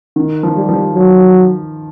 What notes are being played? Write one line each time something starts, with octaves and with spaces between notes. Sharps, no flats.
D#3
F3
G3
F3
F#3